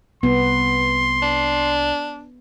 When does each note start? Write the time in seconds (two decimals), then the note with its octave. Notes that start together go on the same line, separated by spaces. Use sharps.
0.23 C2 B3 C6
1.22 D4